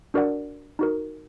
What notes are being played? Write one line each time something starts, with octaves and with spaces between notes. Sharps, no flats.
D4 F#4 A#4 D5 F#5
D#4 F#4 A#4